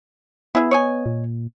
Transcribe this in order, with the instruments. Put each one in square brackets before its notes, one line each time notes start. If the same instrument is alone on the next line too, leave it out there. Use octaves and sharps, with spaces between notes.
[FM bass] B3 [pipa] E4 G#4 E5
[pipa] C#5 D#5 G#5
[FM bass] A#2